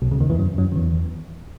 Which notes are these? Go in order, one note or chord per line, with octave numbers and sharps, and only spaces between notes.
B1 B2
C#2 C#3
D#2 D#3
E2 E3
F#2 F#3
F#2 F#3
D#3
E2 E3